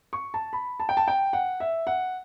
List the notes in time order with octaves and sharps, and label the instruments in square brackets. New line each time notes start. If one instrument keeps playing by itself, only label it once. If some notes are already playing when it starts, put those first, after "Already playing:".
[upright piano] C#6
A5
B5
A5
G5
A5
G5
F#5
E5
F#5